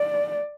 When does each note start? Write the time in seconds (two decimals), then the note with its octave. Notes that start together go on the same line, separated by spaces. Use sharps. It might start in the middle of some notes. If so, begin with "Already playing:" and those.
Already playing: D5